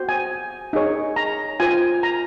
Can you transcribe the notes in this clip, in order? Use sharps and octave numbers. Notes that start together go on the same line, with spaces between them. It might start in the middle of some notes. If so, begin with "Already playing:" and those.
Already playing: F#4 C5
G#5
D#4 G#4 C#5
A#5
F4 C5 G#5
A#5